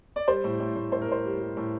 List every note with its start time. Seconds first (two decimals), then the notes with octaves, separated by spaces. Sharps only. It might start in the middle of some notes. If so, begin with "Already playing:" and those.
0.16 D5
0.28 G3 C5
0.44 A2
0.60 A2
0.76 A2
0.92 A2 C5
1.02 A#4
1.08 A2 C5
1.25 G3
1.40 G3
1.57 A2